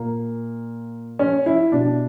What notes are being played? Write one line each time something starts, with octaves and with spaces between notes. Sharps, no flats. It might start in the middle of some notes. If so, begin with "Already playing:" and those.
Already playing: A#2 A#3
C#4
E4
B2 D4